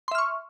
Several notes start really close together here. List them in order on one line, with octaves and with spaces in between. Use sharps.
C6 E5 F6 C#6